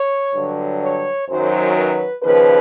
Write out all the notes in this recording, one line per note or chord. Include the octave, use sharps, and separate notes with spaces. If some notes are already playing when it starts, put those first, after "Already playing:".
Already playing: C#5
G2 D3 F#3
C#5
F#2 D#3 F#3 C5
B4
D#2 C#3 F3 B4